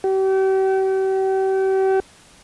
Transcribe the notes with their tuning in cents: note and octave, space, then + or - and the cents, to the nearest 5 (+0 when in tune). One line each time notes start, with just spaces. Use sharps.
G4 -40